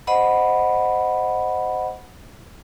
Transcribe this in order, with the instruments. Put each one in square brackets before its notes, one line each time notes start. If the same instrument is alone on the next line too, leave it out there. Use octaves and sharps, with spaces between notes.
[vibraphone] C5 D#5 F#5 B5